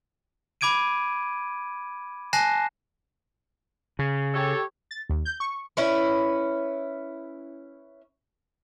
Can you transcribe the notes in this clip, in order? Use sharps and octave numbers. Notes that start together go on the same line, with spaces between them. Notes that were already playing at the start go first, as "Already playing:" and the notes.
B5 D6 G#6 D7 D#7
G#5 A5 F#6 A#6 C7 E7
C#3
G4 A4 C#5
A6
D#2
G6
C#6
C#4 E4 B4